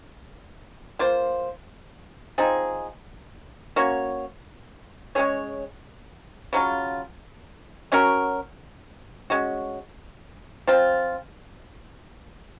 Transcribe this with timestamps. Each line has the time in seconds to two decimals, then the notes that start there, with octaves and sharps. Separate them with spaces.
0.99 A#3 F4 C5
2.38 F3 C4 D#4 G#4
3.76 A#3 C#4 F#4 C#5
5.15 G#3 C#4 G#4 C#5
6.53 C#3 F#3 C#4 F4
7.92 F#3 C#4 F#4 A#4
9.30 G#3 C#4 F#4
10.67 F3 C4 F4